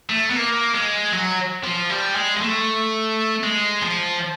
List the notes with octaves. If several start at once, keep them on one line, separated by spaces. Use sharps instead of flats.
A3
B3
A#3
G#3
F#3
F3
G3
G#3
G#3
A3
G#3
F3